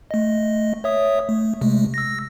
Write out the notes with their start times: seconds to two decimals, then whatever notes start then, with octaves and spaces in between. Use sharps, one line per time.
0.11 A3 D#5
0.84 C#5 E5 D#6
1.29 A3
1.61 C3 G#3 A3
1.94 E6 A#6